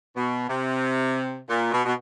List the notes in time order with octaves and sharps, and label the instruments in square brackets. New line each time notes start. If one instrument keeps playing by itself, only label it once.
[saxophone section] B2
C3
A#2
B2
B2